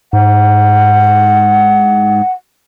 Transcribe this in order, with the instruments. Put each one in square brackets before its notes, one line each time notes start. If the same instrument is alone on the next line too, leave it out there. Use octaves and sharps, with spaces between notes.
[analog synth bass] G#2 [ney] F#5